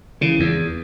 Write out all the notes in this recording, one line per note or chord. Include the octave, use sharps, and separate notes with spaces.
C#3 E3
E2